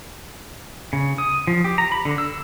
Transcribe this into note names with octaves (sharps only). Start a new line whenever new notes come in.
C#3
D#6
F3
G4
A#5
B5
D3
E6